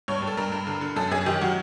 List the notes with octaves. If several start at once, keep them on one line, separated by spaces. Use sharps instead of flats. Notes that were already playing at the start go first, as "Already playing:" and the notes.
G2 C#5
G2
A4
G2 A#4
G2
D3
D3
F#2 A4
F#2 G#4
D#3 G4
F#3 F#4